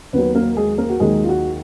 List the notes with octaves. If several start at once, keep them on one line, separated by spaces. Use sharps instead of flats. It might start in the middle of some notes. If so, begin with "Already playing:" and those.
D#2 D#3 F#3 B3 B4
A#3 A#4
G#3 G#4
A#3 A#4
F#4
D#2 D#3 F#3 G#3 G#4
F4
F#4